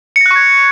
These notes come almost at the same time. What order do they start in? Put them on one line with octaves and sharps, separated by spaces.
C#7 A#6 F#6 C#6 G#6